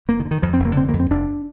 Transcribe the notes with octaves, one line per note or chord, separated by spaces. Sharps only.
F1 A#3
D#3
D3
D#3
F2 F3
C4
F1
A#3
D3 C4
F2 A#3
C4
F1 D4